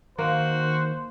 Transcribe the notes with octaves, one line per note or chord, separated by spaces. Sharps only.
D#3 A#3 F#4 C5